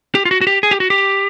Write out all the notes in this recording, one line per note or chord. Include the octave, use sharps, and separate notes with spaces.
G4
F4
F#4
F#4
G4
G#4
G4
F#4
G4